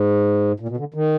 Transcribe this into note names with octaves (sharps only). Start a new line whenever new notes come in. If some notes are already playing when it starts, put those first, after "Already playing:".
Already playing: G#2
A#2
B2
D3
D#3